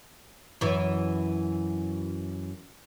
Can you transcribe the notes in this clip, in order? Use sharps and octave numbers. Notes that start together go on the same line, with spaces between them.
F#2 E3